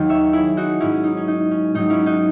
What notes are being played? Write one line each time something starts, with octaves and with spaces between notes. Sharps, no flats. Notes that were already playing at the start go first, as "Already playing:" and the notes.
Already playing: D#2 D#3 F#3
C#5 E5
E4 G#4
D#4 F#4
G#2 F#3 C#4 E4
D#4
C#4
D#4
C#4
G#2 F#3 D#4
C#4 E4
D#4 F#4